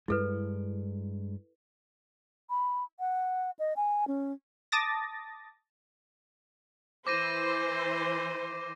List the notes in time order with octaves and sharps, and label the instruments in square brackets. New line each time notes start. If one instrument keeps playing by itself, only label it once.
[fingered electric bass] G2 G#3 [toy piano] E4 A4 B4
[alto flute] B5
F#5
D#5
G#5
C#4
[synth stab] A5 D6 D#6 A6 A#6
[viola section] E3 C5 [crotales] D6 A#6 D#7